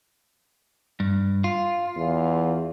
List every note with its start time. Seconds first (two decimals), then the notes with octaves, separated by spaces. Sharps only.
1.00 G2
1.44 F4
1.96 E2